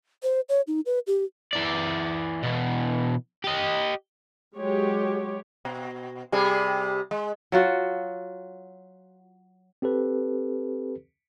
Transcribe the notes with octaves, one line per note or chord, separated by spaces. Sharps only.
C5
C#5
D#4
B4
G4
E3 D5
B2 E3
G4 D#5
F#3 G#3 G4 C#5
B2
C3 G3 G#4
G#3
F#3 F4 F#4 F#5
C4 G4 A4 B4